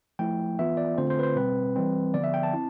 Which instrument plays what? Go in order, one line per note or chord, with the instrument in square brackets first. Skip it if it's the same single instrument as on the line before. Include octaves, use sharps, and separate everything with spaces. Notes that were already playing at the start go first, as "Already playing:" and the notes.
[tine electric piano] F3 A3 E4 G5
E3 B3 F4 E5
D5
D3 A3 C4 F4 C5
C5
B4
C5
B2 G3 C4 B4
E3 G3 C4
D3 F3 B3 D5
E5
G5
A5
C4 E4